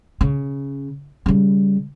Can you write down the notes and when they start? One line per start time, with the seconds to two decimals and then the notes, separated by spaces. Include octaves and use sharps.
0.21 C#3
1.26 C#3 G3